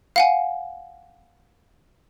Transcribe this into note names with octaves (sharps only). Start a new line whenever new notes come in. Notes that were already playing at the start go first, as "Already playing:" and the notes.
F5 F#5 G#5